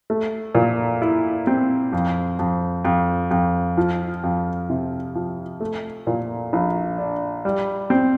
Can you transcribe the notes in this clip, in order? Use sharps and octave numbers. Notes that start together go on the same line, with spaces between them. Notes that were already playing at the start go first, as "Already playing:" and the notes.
A3
A#2
E4
C4
F2
F2
F2
F2
F3
F2
C3
F3
A3
A#2
A#1
D4
G3
C4